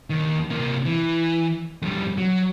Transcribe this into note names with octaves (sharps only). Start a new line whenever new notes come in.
D#2 D#3
C3 A#3
E3
F2 G3
F#3